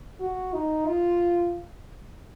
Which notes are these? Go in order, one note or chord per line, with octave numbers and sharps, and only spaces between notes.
F#4
D#4
F4